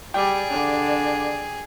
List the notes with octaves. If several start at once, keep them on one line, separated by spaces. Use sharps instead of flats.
G3 G#4 D5 G5
D3